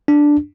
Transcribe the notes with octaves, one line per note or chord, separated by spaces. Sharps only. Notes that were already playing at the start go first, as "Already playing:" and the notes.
D4